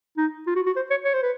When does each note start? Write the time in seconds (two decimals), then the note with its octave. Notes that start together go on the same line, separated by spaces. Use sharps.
0.17 D#4
0.47 F4
0.56 F#4
0.66 F#4
0.76 C5
0.90 C#5
1.05 C#5
1.14 C5
1.22 B4